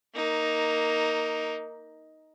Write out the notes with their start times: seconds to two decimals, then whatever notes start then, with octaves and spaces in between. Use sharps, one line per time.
0.15 A#3 D#4